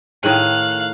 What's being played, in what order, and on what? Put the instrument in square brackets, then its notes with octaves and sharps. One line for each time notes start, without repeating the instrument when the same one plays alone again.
[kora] A2 D#3 G#4 [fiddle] F5 F#6